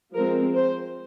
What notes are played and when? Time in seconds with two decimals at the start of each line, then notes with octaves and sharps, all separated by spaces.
0.14 F3 G#3 C4 A#4
0.55 C5